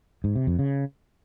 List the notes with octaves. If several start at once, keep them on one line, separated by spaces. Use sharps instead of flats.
G#2
C3
F2
C#3